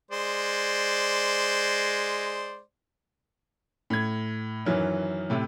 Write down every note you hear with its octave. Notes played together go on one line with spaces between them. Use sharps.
G#3 C5 D5
A2 G#6
F#2 D#3 E3 F#3 C#4
A2 C3